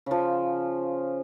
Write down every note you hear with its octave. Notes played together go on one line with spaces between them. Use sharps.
C#3 F3